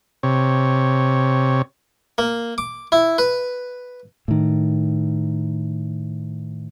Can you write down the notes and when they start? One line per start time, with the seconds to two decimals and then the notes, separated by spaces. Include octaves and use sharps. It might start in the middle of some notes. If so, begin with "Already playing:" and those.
0.23 C3 C#5
2.18 A#3
2.58 D6
2.92 E4
3.18 B4
4.28 A2 D#3